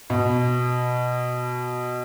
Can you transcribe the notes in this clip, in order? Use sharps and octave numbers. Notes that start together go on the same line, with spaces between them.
B2